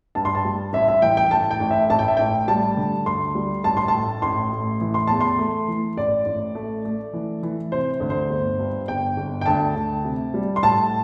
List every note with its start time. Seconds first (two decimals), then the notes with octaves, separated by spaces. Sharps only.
0.15 G2 A5
0.25 C6
0.35 A5
0.45 G3
0.73 A1 E5
0.88 E5
1.02 E3 G5
1.17 G5
1.31 A2 A5
1.51 G5
1.60 A1
1.71 E5
1.90 A1 A5
1.99 G5
2.08 E5
2.17 A1 G5
2.48 G3 A5
2.77 D3
3.06 D2 C6
3.35 G3
3.64 A1 A5
3.77 C6
3.88 A5
3.93 A2
4.22 A1 C6
4.52 A2
4.81 E3
4.94 C6
5.07 E2 A5
5.21 C6
5.39 A3
5.68 E3
5.97 A1 D5
6.26 A1
6.55 A3
6.85 A3
7.13 E3
7.43 E3
7.72 C3 C5
8.00 D2
8.10 C5
8.30 G1
8.59 G2
8.88 G1 G5
9.17 G1
9.41 G5
9.46 D2 A5
9.76 D2
10.04 C3
10.34 G3
10.56 C6
10.62 A2 A5